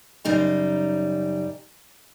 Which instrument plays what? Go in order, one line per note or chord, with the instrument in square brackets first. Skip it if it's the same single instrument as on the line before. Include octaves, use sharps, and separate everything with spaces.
[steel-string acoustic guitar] F#2 C#3 G3 D#4 A#5